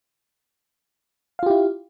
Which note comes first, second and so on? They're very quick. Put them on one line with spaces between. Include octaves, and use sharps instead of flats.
F5 F4 G4 E4